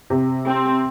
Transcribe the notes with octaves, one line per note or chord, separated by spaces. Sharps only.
C3
C4